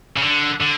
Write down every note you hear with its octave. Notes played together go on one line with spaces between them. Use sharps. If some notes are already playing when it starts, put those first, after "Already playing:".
C#3
D3
D3